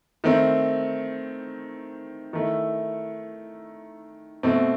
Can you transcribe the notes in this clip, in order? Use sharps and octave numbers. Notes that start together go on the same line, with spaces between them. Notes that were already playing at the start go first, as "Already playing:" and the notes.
D#3 A3 C4
D#3 A3 E4
B2 A3 C4